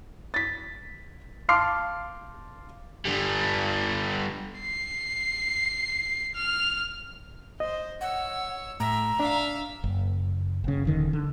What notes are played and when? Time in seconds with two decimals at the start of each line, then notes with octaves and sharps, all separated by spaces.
0.34 A6 B6
1.49 F5 A5 C6 D6 F6 C7
3.05 D3 G3
4.60 C7
6.35 F6
7.60 C5 D#5
8.01 C#5 F#5 E6
8.80 A2 E5 A#5
9.20 D4 E5 F5
9.84 F#1
10.64 F#1 C#3
10.87 D#1 D3 D#3
11.13 D3